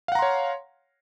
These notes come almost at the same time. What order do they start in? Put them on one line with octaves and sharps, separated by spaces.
F5 F#5 A#5 C6 C#5